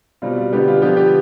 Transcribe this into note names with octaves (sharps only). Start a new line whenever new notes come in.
B2 G3 C4 F4
F4
D3 G3 B3 G4
F4
D3 F3 B3 G4
G4